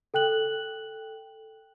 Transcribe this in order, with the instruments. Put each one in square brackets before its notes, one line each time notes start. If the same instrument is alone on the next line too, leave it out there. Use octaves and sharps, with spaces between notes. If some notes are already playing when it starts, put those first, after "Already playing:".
[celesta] A4 G5 F#6 F#7